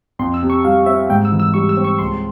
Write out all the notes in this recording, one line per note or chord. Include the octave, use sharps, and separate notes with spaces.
F2 C6
E6
C3
C#6
G3 F5
C4 E5
G#2 G5
E6
E3
E6
G3 C#6
E6
C4
C#6
C#2 C6